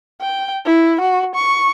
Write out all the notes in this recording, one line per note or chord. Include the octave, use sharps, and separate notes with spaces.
G5
E4
F#4
C#6